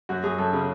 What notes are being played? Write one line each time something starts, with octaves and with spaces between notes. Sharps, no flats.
F#2 F#4
F#2 G#4
F#2 A4
C#3